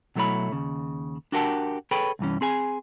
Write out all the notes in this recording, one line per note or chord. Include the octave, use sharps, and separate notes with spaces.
B2 F#3 A3 E4 C#5 B5
D#2 C#3
D4 F#4 G4 A#4 F#5 A5
G#4 A4 B4 C#5 G5 B5
C2 G2 E3 C#4
C4 G#4 G#5